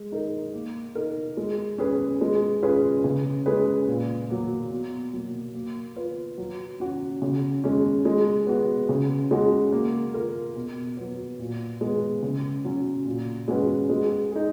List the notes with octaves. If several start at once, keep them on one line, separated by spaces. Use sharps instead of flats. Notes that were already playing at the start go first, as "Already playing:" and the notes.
Already playing: G#3
D#4 A#4
A#3
D#4 A#4
G#3
C#4 G#4 B4
G#3
C#4 F4 G#4 B4
C#3
G#3 C#4 G#4 B4
A#2
F#3 A#3
B2
F#3 A#3
A#3
F4 B4
F#3
C#4 F#4
C#3
G#3 C#4
G#3
B3 F#4
C#3
G#3 C#4 F#4
A#3
F4 A#4
B2
F#3 B3
A#2
G#3 B3
C#3
F#3 C#4
A#2
G#3 C#4 F#4 B4
G#3
D#4 G#4